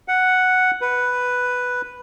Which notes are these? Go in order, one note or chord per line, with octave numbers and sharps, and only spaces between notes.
F#5
B4